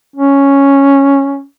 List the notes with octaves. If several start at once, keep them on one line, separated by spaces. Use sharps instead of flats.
C#4